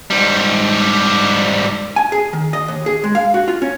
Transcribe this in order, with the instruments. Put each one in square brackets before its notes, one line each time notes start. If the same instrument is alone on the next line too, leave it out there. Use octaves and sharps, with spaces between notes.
[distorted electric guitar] G#2 G3
[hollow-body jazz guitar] G#5
G#4
D#3
D#5
D#2
G#4
G#3
F5
F#4
F4
C#4